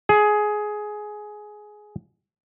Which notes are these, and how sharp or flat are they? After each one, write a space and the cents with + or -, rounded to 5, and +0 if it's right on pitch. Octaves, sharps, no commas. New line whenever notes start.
G#4 +15